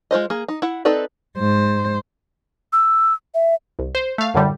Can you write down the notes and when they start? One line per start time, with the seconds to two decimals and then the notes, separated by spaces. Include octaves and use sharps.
0.11 G#3 F4 C5 D#5
0.30 A#3 G#4
0.48 D#4
0.62 E4 F#5
0.85 C4 D#4 A4 B4 D5
1.38 G#2 C5
2.73 E6
3.34 E5
3.79 C2
3.95 C5
4.18 A3 F5
4.34 F#2 A2 D3 G3